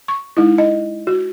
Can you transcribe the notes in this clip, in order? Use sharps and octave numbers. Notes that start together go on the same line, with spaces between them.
C#6
G#3 D#4 E4
D#5
F#4